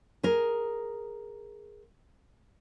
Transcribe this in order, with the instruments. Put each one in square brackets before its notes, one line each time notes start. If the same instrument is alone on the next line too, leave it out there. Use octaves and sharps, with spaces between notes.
[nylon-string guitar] G#4 A#4